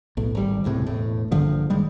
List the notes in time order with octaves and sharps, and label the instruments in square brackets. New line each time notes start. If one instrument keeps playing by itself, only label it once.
[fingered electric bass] B1 A2
G#1 G3
E1 C#2 A2 C3
E1 A2
A#1 G2 D3 F3
F#1 D#3 G3 G#3